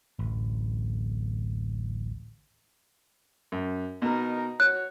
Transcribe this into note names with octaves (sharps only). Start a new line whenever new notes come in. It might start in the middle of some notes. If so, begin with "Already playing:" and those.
D1 A1
F#2
B2 D#4 A#4
F#4 C#5 F#6